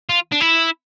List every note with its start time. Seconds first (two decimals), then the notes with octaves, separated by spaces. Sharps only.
0.09 F4
0.32 D4
0.41 E4